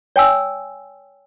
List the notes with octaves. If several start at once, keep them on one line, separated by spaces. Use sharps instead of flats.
C#5 G5 G#5 E6